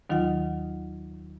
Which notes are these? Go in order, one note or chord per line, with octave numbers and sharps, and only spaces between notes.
D#2 D#3 F#3 D#4 F4 F#5